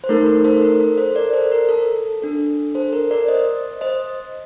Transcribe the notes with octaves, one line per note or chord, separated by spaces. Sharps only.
C5
A3 D#4 A4 A#4
A#4
A4 C5
A#4
A4
A4 C5
A#4 D5
A4 C5
A#4
A4
D4 A4
A4 C5
A#4
A#4 D5
C5 D#5
C5 D#5